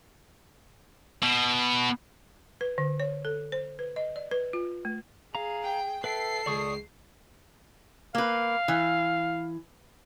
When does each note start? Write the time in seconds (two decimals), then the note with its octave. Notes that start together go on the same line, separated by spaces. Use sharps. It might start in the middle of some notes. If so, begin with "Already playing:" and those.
1.23 B2
2.61 B4
2.78 D3
3.00 C#5
3.25 A4
3.52 C5
3.79 B4
3.96 D#5
4.16 D5
4.31 B4
4.53 F4
4.85 A3
5.35 G#4 F5 A#5
5.64 G5
6.04 A4 B4 E5 G5 C7
6.46 C#2 D5 C#6 D#6
8.15 A#3 B4 F5
8.68 E3